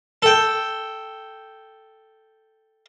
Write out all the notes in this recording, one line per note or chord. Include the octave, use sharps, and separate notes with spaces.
A4 G5